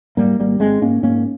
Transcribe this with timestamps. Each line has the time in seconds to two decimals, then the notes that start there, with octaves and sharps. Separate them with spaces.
0.17 G#2 G3 A#3
0.39 G#1 G3 A#3
0.60 G#1 G#3 C4
0.82 G#2 A#3 C#4
1.03 G#2 A#3 C#4